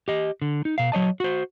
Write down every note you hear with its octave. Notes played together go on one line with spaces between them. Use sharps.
G4 D#5
D3
D#4
B2 F5
F#3 C#5 D#5 A5
F#4 C5